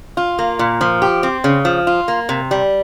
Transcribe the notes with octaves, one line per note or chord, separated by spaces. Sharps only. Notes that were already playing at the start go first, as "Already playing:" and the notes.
F4
A#3
A#2
F3
G4
C4
C#3
F3
F4
A#3
C3
G3